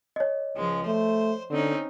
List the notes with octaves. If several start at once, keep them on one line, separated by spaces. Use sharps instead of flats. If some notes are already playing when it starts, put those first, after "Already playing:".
C#5 D#5
C#2 F3 G#3
A3 C5
D3 C4 C#4 D#4